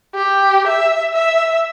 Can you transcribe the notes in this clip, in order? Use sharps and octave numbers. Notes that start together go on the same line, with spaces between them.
G4
E5
E5